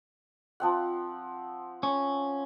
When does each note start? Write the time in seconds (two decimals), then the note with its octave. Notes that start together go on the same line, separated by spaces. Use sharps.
0.60 F3 C4 F#5
1.83 C#4